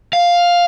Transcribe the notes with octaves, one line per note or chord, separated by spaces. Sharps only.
F5